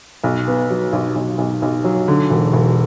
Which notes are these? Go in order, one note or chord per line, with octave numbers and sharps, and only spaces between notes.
B1
B3
F#3
B1
B1
B1
B1
F#3
D3
E1
E1